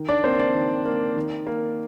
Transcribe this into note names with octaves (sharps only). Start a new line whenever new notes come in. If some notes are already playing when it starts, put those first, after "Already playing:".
Already playing: D#3
D4 D5
A#3 C4 C5
D4 D5
D#3
A#3
D#3
A#3